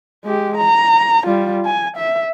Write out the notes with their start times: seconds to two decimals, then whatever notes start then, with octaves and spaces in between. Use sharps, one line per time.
0.25 G#3 G4
0.57 A#5
1.26 G3 F4
1.66 G#5
1.97 E5